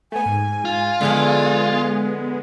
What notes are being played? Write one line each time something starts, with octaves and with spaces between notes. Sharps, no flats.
A3 B3 G#5
G#2
F4
D3 F3 G#3 B3 E4 G#4